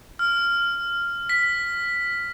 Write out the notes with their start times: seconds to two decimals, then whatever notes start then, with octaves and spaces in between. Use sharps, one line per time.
0.19 F6
1.29 B6